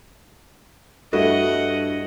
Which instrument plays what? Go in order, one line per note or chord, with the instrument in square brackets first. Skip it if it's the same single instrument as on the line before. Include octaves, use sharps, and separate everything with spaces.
[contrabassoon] G2 [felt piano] A3 E4 F#4 [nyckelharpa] D#5 F#5